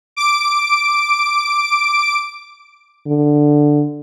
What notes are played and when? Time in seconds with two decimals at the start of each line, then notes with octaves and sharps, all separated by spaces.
0.17 D6 D7
3.07 D3